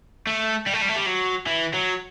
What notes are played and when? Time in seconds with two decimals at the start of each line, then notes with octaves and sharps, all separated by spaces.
0.27 A3
0.66 G3
0.73 A3
0.81 G3
0.88 A3
0.96 G3
1.06 F#3
1.46 E3
1.73 F#3